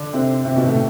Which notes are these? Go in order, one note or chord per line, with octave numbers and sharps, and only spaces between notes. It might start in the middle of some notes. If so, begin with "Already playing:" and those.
Already playing: D3 D4
C3 C4
C3 C4
B2 B3
A2 A3